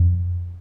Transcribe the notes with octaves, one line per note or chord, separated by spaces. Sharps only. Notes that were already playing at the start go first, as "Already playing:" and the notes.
Already playing: F2